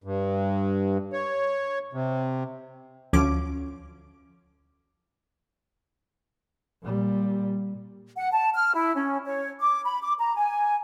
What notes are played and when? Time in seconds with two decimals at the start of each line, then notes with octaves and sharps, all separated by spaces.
0.04 G2
1.13 C#5
1.93 C3
3.13 D2 F3 C#4 D6
6.82 A#2 G3
8.17 F#5
8.32 A5
8.54 F6
8.74 E4
8.95 C#4
9.26 C#5
9.60 D6
9.85 B5
10.02 D6
10.19 A#5
10.36 G#5